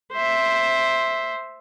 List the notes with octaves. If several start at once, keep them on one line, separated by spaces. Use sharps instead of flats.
C5 E5